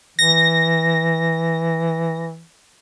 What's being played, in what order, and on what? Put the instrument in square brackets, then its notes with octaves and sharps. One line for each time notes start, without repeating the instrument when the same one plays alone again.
[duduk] E3 [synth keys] A#6